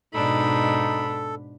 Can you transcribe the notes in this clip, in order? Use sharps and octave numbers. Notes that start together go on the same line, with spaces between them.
G#2 B2 D4 D#4 A4 B5